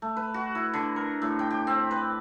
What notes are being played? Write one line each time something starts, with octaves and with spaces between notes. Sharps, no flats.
A3
B4
F#4
E4
D3
A#4
A2
G5
G4
C4
B4